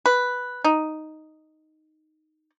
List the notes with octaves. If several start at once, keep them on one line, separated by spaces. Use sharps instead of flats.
B4
D#4